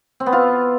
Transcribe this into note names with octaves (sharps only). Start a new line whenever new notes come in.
C4
B3
F4